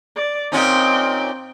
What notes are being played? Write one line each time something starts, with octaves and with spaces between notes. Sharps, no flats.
D5
A#2 C4 C#4 D#4 G5